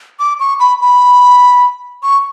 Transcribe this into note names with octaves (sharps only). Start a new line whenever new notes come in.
D6
C#6
B5
B5
C#6